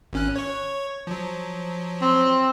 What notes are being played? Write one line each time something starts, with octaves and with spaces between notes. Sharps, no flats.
G#1 C#4 F#6
C#5 C#6
F3 F#3
C4